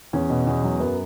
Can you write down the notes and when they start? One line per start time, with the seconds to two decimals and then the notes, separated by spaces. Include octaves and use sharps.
0.13 E2 C#4
0.30 B2
0.47 E2
0.63 F#3
0.80 F#2 B3